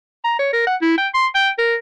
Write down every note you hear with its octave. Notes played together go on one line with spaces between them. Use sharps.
A#5
C#5
A#4
F#5
E4
G5
C6
G5
A#4